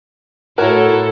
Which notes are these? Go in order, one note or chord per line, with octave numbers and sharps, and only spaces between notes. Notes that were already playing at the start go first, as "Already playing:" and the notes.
A2 E4 F#4 A4 A#4 C#5